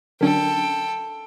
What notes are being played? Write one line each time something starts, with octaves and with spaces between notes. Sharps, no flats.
D3 F#3 C#4 D4 A4 A#4 G5